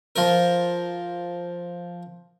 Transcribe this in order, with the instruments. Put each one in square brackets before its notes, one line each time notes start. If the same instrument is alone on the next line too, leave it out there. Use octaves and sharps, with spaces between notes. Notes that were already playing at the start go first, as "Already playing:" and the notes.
[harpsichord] F3 A#4